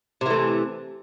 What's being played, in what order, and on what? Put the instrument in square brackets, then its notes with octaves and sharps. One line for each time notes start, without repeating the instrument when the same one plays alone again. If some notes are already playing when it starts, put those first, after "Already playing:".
[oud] C3
E3
A3